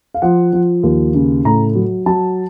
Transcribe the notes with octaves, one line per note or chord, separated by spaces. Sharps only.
F5
F3 F#5
F3
D#2
C#3
A2 A#5
F#3
F#3 A5